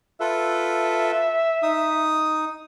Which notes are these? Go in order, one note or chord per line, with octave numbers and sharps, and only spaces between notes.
F4 A4 B4 E5
D#4 D#6